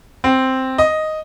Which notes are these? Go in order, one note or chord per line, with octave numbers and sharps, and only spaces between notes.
C4
D#5